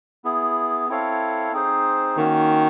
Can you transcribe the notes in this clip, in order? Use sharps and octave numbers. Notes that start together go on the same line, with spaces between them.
B3 E4 G#4
C4 E4 A4 C#5 F5
C4 D#4 G#4 C5
D#3 A#3 C#4 F#4